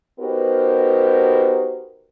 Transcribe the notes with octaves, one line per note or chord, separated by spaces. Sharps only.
B3 D#4 F#4 G4 A#4 C5